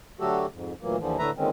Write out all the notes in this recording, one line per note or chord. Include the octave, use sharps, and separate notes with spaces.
D3 F#3 A3 F#4 G4 A4
F2 G#2
D2 A#2 E3 F#3 A#3
D#2 D3 E3 F3
A2 D3 A3 B4 E5 A#5
A#2 D3 D#3 G#3 C4 C#4